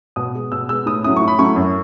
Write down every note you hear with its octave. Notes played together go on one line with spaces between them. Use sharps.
B2 D#6
G#3 B3
B2 E6
G#3 B3 E6
A2 D#6
F#3 A3 C#4 E4 D#6
C#6
A2
B5
F#3 A3 C#4 E4 C#6
F#2